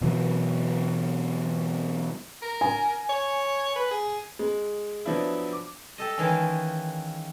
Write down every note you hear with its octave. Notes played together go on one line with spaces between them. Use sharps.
B2 E3 F#3
A#4
G#5
C#5
B4
G#4
G#3
F3 F#3 B3 D4 E4
D6
G4 A4 D#5
D#3 E3 G#3 A#3 C#4